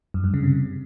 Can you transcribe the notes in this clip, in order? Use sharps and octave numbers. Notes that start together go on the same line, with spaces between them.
F#2
G2
C#3
C3